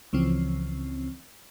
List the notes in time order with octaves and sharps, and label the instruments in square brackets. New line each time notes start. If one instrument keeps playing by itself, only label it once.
[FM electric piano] C#2 C#3 E3 F3 C4